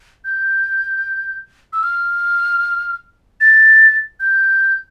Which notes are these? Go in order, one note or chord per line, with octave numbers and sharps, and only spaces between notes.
G6
E6
F6
A6
G6